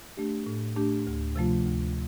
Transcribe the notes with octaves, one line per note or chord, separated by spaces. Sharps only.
A3 D4 G4
A2
A3 D4 G4
D2
C3 F3 A3 F4
D2